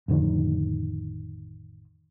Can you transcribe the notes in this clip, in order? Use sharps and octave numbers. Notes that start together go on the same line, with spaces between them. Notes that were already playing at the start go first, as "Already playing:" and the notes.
A1 F2 D3 D#3